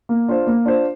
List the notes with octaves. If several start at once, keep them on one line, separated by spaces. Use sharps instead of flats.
A#3
D4 F4 C5
A#3
D4 F4 C5